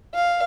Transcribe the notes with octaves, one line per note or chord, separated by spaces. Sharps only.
F5